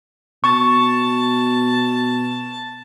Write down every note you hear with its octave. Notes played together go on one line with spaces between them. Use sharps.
B2 A5 C#6